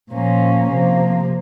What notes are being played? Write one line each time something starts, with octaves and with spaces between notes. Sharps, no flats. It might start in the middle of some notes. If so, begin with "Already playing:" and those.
A#2 F3 A#3 C#4
C3 F3 A#3